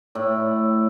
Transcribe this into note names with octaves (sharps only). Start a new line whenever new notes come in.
A2 D5